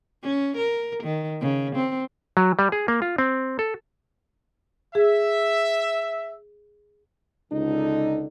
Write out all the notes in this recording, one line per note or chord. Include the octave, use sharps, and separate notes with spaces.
C#4
A#4
D#3
C#3
C4
F#3
G3
G#4
A#3
F4
C4
A4
G#4 E5
C#2 D3 D#4